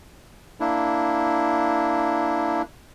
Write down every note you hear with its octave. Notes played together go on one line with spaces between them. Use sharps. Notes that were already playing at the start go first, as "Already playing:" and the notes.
A#3 D4 E4